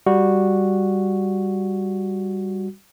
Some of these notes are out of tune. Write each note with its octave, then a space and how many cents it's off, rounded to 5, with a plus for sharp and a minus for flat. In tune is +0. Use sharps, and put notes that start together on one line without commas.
G3 +0 F#4 -5